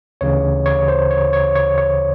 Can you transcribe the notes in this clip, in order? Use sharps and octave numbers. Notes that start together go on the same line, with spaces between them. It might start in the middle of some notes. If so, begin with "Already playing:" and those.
D2 C#3 E3 C#5
C#5
C5
C#5
C#5
C#5
C#5